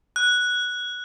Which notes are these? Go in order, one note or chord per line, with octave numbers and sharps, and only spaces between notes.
F#6